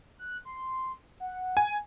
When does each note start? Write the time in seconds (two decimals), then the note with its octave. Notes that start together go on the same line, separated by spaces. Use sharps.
0.19 F#6
0.45 C6
1.20 F#5
1.57 G#5